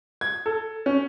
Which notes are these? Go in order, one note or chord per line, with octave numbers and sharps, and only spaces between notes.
G#6
A4
C#4